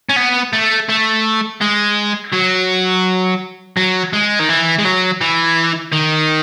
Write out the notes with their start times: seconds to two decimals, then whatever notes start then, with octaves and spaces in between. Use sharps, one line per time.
0.09 C#4
0.16 B3
0.53 A3
0.89 A3
1.61 G#3
2.32 F#3
3.77 F#3
4.13 G#3
4.39 D#3
4.49 E3
4.79 G#3
4.85 F#3
5.21 E3
5.93 D#3